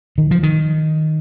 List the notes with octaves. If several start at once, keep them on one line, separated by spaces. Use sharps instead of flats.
D#3
F3
D#3